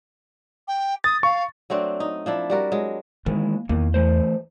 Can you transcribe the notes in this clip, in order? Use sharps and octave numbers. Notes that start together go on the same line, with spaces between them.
G5
D#6 A6
F5 C#6
F#3 A3 C4 D4
D#4
F3 D4 E4
G3 F#4 A#4
F#3 G#3
D#3 E3 G#3 A#3
E2 D#3 A#3
E3 A3 C5